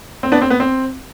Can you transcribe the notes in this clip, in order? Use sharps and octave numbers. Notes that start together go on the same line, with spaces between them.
C4
B3 D4
C4
B3
C4